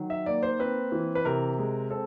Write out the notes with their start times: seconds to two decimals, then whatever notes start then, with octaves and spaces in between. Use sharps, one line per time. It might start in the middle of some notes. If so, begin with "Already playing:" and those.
Already playing: D#3 F#3
0.10 E5
0.26 A#3 D5
0.43 C5
0.59 C4 B4
0.92 E3
1.15 B4
1.25 C3 A#4
1.58 G#3
1.91 C4 A4